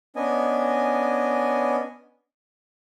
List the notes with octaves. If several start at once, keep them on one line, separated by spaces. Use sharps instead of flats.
B3 C#4 D4 D#5 G#5